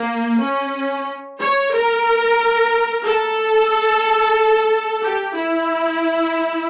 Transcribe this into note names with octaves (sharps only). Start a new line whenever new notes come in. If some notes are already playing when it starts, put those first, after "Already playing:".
Already playing: A#3
C#4
C#5
A#4
A4
G4
E4